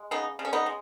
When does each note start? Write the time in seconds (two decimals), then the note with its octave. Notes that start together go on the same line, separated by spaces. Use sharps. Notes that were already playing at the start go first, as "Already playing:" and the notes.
Already playing: G#3
0.11 C#3 B3 D#4
0.39 C#3
0.45 C#4
0.53 B3 D#4
0.66 G#3